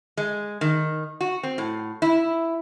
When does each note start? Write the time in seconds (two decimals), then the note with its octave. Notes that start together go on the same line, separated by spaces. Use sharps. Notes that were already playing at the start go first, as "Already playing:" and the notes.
0.17 G#3
0.61 D#3
1.21 F#4
1.43 C4
1.58 A2
2.02 E4